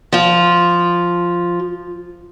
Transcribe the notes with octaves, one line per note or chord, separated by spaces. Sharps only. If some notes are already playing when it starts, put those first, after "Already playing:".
F3 F4